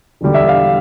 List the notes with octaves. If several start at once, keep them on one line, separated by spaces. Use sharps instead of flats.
E1 E2 D3 G3
E5
F5